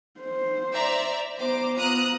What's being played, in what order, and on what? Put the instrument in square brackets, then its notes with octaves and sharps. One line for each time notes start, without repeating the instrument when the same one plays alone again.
[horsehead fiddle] C5
[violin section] D5 E5 A#5
[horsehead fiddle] B3 A#5 [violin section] C5 D6
[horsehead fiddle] B3 F4 [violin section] A#5 D#6 F#6